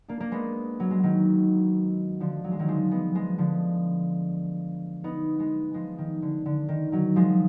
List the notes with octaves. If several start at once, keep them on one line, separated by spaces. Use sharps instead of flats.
A#3 D4
A#3
G#3 B3
F#3
G#3
D#3 F#3
D3 F3
F#3
G#3
D#3 F#3
F3 G#3
G#3 B3
F3 G#3
D3 F3
B3 D#4
G#3 B3
F3 G#3
D#3
D3
D3
D#3
D#3 F#3
F3 G#3